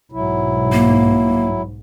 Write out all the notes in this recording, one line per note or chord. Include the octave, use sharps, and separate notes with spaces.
B1 G#2 F#3 E4
A#3